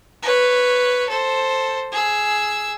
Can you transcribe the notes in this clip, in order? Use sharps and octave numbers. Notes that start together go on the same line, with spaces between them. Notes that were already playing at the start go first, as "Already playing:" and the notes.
B4 C#5
A4 C5
G#4 E6